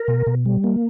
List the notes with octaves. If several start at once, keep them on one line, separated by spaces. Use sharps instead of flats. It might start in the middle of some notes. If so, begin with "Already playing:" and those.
Already playing: A#4
B2
B2
G3
A#3